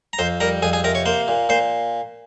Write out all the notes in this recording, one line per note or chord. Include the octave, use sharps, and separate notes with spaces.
A#5
F2 C5 C6
G3 A#4 A#5
F2 G#4 G#5
G#4 G#5
C3 A#4 A#5
C#5 C#6
A#3 C5 C6
A#2
A#2 C5 C6